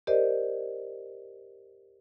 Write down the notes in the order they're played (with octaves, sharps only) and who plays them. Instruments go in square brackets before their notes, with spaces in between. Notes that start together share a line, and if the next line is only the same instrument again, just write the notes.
[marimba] G4 A#4 C5 D5 D#5